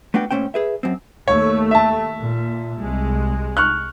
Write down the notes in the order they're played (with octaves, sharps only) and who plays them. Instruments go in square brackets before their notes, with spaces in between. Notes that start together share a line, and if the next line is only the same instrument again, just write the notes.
[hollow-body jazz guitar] A3 B3 D4 F#4 G5
A#2 F3 A3 C#4 C5 G5
G#4 B4 E5
F#2 C4
[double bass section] D#2 A3 [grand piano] C#5
[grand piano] E5 A5
[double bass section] A#2
C2 G#3
[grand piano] C#6 F6 F#6